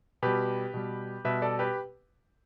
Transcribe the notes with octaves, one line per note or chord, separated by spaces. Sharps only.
B2 G3 G4 B4
B2 G3
B2 G3 B4 E5
A4 D5
G4 B4